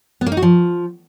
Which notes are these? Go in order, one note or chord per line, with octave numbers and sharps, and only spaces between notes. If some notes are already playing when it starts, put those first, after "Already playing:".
B3
A#3
D#4
F#4
F3